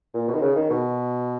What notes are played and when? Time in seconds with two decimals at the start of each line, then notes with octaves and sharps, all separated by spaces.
0.14 A#2
0.28 B2
0.35 D#3
0.42 C#3
0.56 D#3
0.70 B2